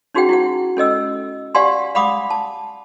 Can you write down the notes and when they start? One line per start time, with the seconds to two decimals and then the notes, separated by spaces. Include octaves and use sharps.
0.14 C#4 D#4 F#4 G#4 F#5 G5
0.29 E4 F#4 F#5
0.77 C#4 A4 D#5 E6
1.55 G4 D5 F5 F#5 G#5 C6
1.95 F5 F#5 B5 D6 D#6
2.30 A5